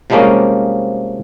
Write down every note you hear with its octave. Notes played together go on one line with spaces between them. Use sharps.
C3 F3 G3 G#3 A#3 C#4